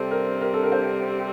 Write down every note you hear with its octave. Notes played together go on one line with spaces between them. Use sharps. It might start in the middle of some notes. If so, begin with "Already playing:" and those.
Already playing: C3 G3 C4 A4
A#4
A#4
A4
A#4
C5